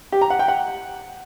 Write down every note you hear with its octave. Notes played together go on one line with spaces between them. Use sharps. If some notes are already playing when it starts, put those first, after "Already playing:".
G4
A#5
F#5
G5
F#5